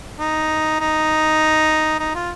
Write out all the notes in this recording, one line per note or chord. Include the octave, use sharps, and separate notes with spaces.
D#4
D#4
D#4
F4